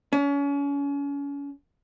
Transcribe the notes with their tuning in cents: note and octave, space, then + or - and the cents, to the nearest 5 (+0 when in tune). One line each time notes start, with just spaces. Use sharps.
C#4 +35